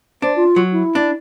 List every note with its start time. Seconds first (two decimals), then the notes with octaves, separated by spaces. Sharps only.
0.22 D4 C5
0.36 F4
0.56 F#3
0.72 E4
0.95 D4